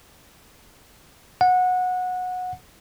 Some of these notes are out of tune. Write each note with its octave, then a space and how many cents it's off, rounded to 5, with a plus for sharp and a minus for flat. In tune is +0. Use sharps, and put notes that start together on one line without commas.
F#5 -20